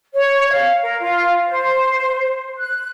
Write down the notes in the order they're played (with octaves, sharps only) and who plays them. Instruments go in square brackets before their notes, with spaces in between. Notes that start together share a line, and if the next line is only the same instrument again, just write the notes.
[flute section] C#5
F5
A#4
F4
C5
F#6